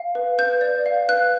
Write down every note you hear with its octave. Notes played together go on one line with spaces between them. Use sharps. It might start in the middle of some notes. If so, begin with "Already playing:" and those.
Already playing: F5
B4
B4 G6
D5
F5
B4 F#6